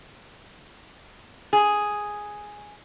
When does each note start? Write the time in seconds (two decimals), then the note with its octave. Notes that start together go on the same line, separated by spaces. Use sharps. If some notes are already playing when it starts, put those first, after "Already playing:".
1.53 G#4